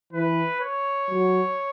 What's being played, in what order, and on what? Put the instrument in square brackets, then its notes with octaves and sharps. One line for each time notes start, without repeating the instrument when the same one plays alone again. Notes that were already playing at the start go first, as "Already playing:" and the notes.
[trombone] E3 [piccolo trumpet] B4
[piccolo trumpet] C#5
[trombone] F#3